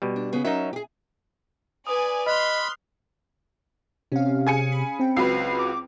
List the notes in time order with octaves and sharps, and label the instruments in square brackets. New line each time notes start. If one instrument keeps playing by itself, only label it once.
[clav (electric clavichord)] B2 G3
[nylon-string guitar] D4
C#3 B3 G#4
[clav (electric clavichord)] F#3 D#4 [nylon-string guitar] C#4 A#4 E5
[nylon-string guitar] G4 G#4
[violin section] B4 D5 G#5 [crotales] D#6
[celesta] D#5 [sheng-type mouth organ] B5 [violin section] C6 [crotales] F6 F#6 F7
[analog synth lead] C3 [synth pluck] C#4 F5
[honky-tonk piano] G#4 G#5 C#7
[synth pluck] B5
C4 G5
[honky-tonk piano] C#2 F#3 B4 [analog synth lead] C7
[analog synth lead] D6